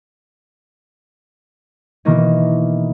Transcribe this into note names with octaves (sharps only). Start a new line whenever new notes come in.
B2 D#3 E3 A#3 D#4